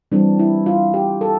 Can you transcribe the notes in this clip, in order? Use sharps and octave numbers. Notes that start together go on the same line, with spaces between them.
E3 G3 C4 D4
E4
F4
G4
A4